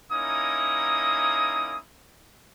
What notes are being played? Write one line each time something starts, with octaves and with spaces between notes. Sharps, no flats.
A#3 C#4 D#4 E4 D#6